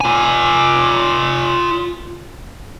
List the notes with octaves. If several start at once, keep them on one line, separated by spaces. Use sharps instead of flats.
F4 G#5